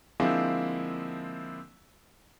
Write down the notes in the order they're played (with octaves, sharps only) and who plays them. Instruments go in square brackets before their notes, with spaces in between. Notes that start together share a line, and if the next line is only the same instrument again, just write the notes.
[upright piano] D3 F3 G#3 A#3 C4 E4